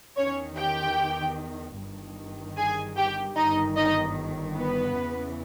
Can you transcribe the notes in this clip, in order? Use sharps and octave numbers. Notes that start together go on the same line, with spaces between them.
E2 D#3 C#4 C#5
G4 G5
G1 G2 D#3
G#4 G#5
G4 G5
G1 G2 D#3 D#4 D#5
D#4 D#5
B3 B4
E2 C#3 E3